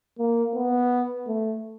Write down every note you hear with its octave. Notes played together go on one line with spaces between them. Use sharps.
A#3
B3
A3